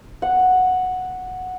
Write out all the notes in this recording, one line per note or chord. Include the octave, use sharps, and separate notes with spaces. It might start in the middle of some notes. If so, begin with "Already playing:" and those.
F#5